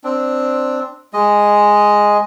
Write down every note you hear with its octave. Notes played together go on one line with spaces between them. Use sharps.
C4 D4
G#3 D#5